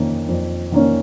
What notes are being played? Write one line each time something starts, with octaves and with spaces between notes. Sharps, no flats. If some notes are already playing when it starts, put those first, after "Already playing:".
Already playing: F2 D#3 A#3 C#4
F2
D#3 A#3 C#4